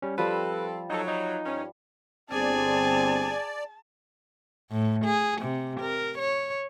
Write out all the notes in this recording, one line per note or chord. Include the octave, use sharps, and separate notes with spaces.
G3 C#4
F3 G3 C4 A4 B4
F#3 D#4 A4
D#4
G2 C#4
G1 C4 G#4 D5 G#5 A5
A2
G#4
C3
A#4
C#5